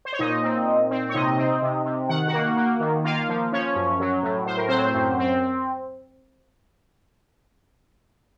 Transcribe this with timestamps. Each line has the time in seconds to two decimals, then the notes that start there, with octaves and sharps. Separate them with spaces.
0.05 C5
0.13 C#5
0.19 A#2 D#4 D#5
0.43 C4
0.67 A#2
0.91 C4
1.09 C#5
1.14 C3 D#4 D#5
1.38 C4
1.62 C3
1.85 C3
2.09 D#3 F#5
2.27 F#4 F#5
2.33 A#3
2.57 A#3
2.80 D#3
3.04 A#3 F4 F5
3.29 F3
3.52 F3 C#4 C#5
3.76 F#2
4.00 F#3
4.23 A2
4.46 A2 C5
4.57 A#4
4.68 F#3 C4 C5
4.94 F#2
5.19 C4